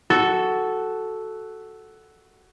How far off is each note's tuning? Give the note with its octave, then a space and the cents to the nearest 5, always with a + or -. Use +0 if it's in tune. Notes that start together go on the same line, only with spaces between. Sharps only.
F#4 +10 A4 -5